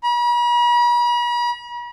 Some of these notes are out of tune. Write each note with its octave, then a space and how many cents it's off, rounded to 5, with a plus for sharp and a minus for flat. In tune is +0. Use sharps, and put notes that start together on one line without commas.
B5 -45